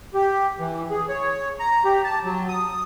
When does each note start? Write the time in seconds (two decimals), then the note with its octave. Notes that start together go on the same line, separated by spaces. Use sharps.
0.14 G4
0.59 E3
0.91 G#4
1.09 C#5
1.60 A#5
1.85 G4
2.04 A5
2.24 F#3
2.49 D#6